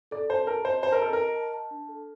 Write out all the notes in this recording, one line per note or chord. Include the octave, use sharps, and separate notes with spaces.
A4 D5
C5 A5
A#4 A5
C5 D#5
C5 A5
A#4
A4 D#5
A#4 D#5
A5
A5
D4
A4